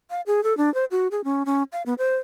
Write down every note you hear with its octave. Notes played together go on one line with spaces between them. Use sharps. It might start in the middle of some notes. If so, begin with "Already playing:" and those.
F5
G#4
A4
D4
C5
F#4
G#4
C#4
C#4
F5
B3
C5